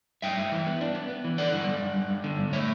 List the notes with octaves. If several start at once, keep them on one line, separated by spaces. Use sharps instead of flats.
G2 E5 G5
G2
E3
B3
D4
B3
B3
E3
D3 D5 F#5
G2
G2
G2
G2
G2
D3
G2
A3 C#5 E5